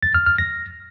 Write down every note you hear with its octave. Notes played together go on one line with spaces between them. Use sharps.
A6
F6
F6
A#6